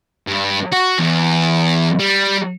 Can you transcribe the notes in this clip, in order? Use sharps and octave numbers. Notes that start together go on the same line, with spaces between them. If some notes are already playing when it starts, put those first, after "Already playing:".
G2
F#4
E2
G3